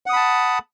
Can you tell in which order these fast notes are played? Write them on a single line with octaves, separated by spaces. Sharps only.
F#5 D#6 B5 A5